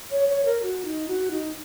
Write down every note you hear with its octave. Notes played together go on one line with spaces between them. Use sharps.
C#5
C#5
A#4
F#4
D#4
F#4
D#4